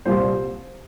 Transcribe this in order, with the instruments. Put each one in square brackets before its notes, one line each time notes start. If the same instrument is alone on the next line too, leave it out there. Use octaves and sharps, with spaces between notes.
[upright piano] C2 A#2 G3 C5